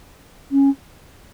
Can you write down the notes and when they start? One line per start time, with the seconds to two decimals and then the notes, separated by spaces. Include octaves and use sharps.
0.52 C#4